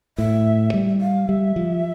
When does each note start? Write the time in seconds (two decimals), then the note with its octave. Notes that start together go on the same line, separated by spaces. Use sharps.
0.18 A2 E5
0.74 G3
1.01 F5
1.28 G3 E5
1.56 F3